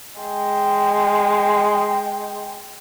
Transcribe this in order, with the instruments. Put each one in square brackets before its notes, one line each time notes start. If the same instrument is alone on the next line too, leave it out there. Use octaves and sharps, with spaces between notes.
[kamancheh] G#3 G5